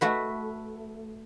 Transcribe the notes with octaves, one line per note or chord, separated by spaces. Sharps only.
A3 F#4 B4